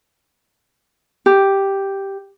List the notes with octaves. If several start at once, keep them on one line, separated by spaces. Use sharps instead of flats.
G4